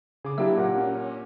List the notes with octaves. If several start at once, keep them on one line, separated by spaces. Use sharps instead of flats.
C#3 G#4 D6
F#3 A#3 D4 E4 G4 E5
A#2 A#4 F#5
C#4